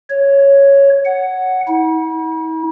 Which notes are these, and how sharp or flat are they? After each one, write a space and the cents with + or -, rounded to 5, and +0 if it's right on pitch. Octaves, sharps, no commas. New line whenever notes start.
C#5 +0
F#5 +5
E4 -45